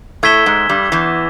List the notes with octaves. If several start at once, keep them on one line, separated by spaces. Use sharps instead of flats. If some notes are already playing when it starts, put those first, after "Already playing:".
A2 A3 E6 G#6 B6 E7 G7
G#2 G#3
G2 G3
E2 E3